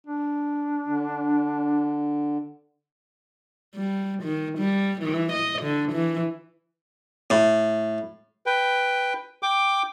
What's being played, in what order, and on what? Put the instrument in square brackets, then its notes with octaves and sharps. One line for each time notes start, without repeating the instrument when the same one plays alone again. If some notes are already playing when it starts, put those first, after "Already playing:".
[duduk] D4
[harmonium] D3
[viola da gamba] G3
D#3
G3
E3
D#5
D3
E3
[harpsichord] A2
[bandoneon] B4 G5
G5 D6